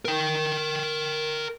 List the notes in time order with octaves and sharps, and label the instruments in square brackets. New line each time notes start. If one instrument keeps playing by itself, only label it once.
[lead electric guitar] A#4 G5